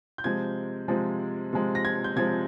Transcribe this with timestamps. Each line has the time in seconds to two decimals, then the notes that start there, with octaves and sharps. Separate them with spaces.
0.18 G6
0.24 C3 F3 G#3 G#6
0.88 C3 F3 G#3
1.53 C3 F3 G#3
1.75 A#6
1.85 G#6
2.04 G6
2.16 C3 F3 G#3 G#6